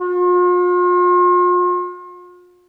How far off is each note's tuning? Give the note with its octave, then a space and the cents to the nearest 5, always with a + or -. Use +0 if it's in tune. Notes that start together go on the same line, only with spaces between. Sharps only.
F4 +40